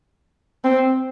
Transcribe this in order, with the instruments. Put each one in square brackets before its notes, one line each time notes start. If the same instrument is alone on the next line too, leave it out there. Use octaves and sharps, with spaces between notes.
[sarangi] C4